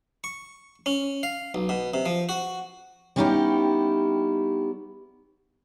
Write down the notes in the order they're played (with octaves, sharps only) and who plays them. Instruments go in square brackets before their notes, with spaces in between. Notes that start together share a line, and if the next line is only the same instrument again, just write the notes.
[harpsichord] C#6
C#4
F5
B1
B2
C3
F3
F#4
[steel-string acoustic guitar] G3 B3 C#4 D#4 E4 G4